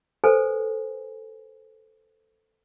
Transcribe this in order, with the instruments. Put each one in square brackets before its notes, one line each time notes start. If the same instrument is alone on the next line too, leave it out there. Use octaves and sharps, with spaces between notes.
[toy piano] A4 B4 C5 G#5